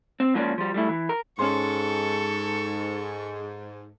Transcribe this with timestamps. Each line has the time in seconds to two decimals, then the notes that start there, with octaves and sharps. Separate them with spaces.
0.20 C4
0.34 G#2 F3 A#3 C#4 D5
0.58 F3 G3
0.74 G3 A3 E4
0.89 E3
1.09 A#4
1.39 G#2 C#4 A4 C5 C#6